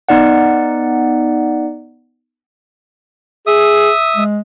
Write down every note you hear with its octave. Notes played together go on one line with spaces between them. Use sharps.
B3 D#4 D5 F#5
G#4 E5 D#6
G#3